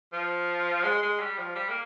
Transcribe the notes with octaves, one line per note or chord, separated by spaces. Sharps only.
F3
G#3
G#3
G3
F3
G3
A#3